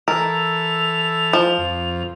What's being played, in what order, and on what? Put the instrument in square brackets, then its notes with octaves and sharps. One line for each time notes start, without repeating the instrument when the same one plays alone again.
[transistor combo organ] E3 A4 [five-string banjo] A#4 [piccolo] F7
[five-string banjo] F3
[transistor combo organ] F2